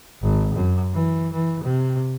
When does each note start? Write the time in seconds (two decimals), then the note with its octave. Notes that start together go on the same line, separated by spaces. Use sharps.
0.22 G#1
0.55 F#2
0.93 E3
1.33 E3
1.63 C3